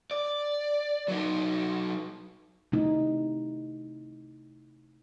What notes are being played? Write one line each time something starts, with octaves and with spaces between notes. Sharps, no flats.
D5
F#3 D#4
C3 A3 D#4 E4